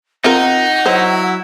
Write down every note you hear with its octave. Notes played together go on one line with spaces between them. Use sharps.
C4 D#4 F4 A#4 F#5
F#3 E4 C5